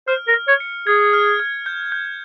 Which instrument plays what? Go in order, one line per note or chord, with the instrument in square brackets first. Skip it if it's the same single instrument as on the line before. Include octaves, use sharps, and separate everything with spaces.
[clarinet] C5 [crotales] F6
[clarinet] A#4
[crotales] F6
[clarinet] C#5
[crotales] C#7
[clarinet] G#4 [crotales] G#6
[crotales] F6
F6
G6
G6